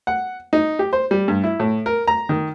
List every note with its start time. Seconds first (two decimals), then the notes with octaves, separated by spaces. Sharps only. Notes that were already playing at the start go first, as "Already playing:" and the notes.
0.07 F#5
0.53 D#4
0.79 G4
0.93 C5
1.11 G3
1.28 G2
1.44 E4
1.60 A2
1.86 A#4
2.08 A#5
2.29 D#3